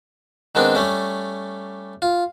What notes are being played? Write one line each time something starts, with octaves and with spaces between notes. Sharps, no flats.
D#3 G#3 B3 C4 D4
G3 A3 C#4
F4